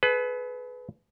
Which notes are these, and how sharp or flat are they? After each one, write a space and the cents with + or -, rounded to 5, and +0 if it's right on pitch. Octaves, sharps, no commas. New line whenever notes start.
G#4 +45 B4 +10